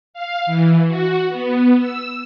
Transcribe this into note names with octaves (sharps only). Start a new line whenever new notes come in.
F5
E3
F#4
B3
E6